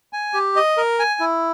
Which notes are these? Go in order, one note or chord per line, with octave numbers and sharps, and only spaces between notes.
G#5
G4
D#5
A#4
G#5
E4